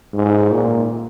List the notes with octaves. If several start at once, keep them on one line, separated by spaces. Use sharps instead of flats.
G#2
A#2